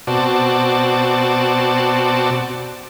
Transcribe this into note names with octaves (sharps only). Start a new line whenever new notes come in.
B2 C4 F#4 D5 A5